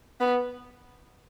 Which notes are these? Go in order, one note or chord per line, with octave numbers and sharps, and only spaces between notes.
B3